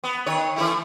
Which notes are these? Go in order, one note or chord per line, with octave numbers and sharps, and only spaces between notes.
B3
D#3 C#5
E3 A3 E4